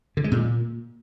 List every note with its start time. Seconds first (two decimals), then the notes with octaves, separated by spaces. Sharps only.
0.17 D3
0.24 G#3
0.32 A#2